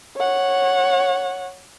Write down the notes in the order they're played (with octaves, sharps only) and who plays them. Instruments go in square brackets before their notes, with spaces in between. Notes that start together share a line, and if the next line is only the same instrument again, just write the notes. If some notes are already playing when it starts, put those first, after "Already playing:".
[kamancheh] C#5 F#5